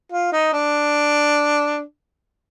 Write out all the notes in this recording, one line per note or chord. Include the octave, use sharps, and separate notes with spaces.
F4
D#4
D4